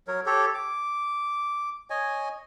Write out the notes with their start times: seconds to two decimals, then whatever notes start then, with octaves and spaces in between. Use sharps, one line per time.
0.08 F#3 A#4 C#5
0.26 G4 A4 C#5
0.54 D6
1.90 C#5 D#5 G#5